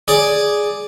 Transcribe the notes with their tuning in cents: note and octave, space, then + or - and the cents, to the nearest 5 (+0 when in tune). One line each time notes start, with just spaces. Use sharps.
G#4 +0 D5 +0